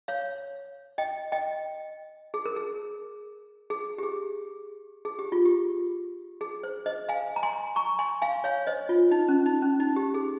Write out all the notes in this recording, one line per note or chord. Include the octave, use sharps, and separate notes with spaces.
C#5 F5
D#5 G5
D#5 G5
G#4
A#4
G#4
G#4
G4
G#4
G#4
G4
F4
G4
G#4
C5
C5 D#5
F5 G#5
A#5
G#5 C6
A#5 C#6
G#5 C6
F5 G#5
C#5 F5
C5 D#5
F4
D#4
C#4
D#4
C#4
D#4
G4
G#4